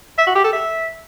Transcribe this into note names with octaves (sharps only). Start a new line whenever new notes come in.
E5
F#4
G4
A4
E5